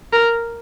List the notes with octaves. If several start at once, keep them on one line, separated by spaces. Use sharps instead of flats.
A#4